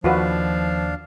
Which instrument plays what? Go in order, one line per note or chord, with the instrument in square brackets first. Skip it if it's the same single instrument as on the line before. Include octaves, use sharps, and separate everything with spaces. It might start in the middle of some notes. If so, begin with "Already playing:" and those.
[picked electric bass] D#2 [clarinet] F3 [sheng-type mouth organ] D4 F5 [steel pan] F4 F#4 B4